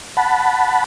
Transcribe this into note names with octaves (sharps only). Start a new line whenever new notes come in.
F#5 A5 B5